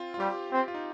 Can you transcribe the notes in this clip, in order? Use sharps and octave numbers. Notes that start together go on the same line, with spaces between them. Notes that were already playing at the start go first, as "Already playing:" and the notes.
Already playing: C4 F4
F4
G3 G4
C4
F4
D#4